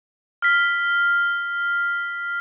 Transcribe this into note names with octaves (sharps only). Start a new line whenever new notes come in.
F6 B6